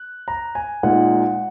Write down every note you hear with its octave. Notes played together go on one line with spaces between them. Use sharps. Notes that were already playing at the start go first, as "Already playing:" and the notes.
Already playing: F#6
A#5
G#5
A#2 G#3 D#4 F#5